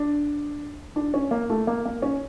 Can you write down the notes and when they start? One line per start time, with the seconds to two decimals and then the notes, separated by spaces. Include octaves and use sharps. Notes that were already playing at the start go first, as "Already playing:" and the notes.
Already playing: D4
0.96 D4
1.14 C#4
1.31 A#3
1.50 A3
1.67 A#3
1.85 A#3
2.02 C#4